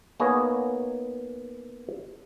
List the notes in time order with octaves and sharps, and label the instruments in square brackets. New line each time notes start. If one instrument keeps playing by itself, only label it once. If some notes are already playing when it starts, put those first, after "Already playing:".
[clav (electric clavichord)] A#3 B3 D#4 G#4 C#5 D#5